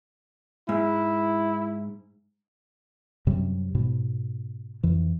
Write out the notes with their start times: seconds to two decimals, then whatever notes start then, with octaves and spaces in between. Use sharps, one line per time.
0.69 G#2 E4
3.27 F#2 C3 F#3 G3
3.75 G#2 B2
4.83 F2 E3